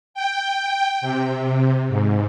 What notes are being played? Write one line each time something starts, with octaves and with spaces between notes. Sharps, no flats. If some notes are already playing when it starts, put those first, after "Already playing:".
G5
C3
G#2